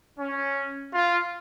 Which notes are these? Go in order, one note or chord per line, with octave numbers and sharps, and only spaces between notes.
C#4
F4